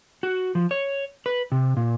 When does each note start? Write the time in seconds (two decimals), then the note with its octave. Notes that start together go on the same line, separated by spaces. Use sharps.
0.23 F#4
0.55 F3
0.71 C#5
1.26 B4
1.52 C3
1.77 A#2